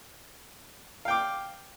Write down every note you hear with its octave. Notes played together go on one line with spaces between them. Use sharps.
F5 G5 D6